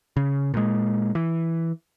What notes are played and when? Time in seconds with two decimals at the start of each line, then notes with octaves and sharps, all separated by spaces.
0.17 C#3
0.54 A#2 G#3
1.15 E3